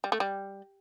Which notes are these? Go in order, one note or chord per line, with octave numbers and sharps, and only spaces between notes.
G3
A3
G3